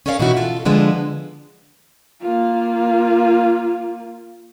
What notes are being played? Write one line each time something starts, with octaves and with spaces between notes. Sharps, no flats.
C#4 A#4 C#5 D5 E5 F5
B2 E3 D#4 E4 F#4
F4 A4
D3 F3 G#3 B3 D4
A#3 F4